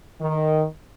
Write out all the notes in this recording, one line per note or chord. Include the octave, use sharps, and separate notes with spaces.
D#3